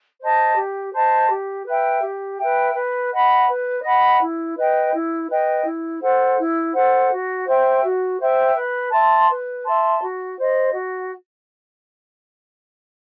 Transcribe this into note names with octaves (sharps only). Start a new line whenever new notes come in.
C5 D#5 A5
G4
C5 D#5 A5
G4
B4 E5 G5
G4
B4 E5 G5
B4
D#5 F#5 B5
B4
D#5 F#5 B5
E4
B4 D#5 G5
E4
B4 D#5 G5
E4
A4 C5 F#5
E4
A4 C5 F#5
F#4
C5 E5 G5
F#4
C5 E5 G5
B4
E5 A5 C6
B4
E5 A5 C6
F#4
C5 D#5
F#4